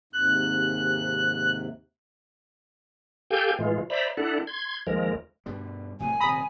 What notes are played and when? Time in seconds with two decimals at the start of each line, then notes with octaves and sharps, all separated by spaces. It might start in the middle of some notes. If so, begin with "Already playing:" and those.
0.13 D#2 G#2 C3 F#6
3.31 G4 A4 F5 G5 G#5 G6
3.59 A2 E3 G#3 F4
3.90 C5 D5 E5 A#5 B5
4.17 D4 E4 A4 F#5
4.47 C6 G#6
4.87 D#2 F3 G#3 A#4
5.46 G2 B2 G3
6.00 C2 A2 F#3 G#5
6.20 D#1 C3 A#5 B5 D#6